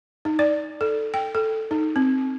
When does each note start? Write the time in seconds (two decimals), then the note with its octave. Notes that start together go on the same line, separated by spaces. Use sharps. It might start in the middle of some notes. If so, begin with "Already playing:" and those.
0.25 D#4
0.39 D5
0.81 A4
1.14 G5
1.35 A4
1.71 D#4
1.96 C4